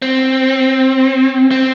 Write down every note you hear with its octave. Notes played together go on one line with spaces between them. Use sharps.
C4
C4